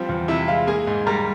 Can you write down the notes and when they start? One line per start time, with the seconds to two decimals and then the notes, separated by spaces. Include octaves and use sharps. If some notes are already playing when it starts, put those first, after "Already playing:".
Already playing: F3 G3 C4
0.09 E2
0.28 C3 E4 E5
0.48 G#3 F4 F5
0.67 A#3 G#4 G#5
0.87 G#2
1.06 G3 A#4 A#5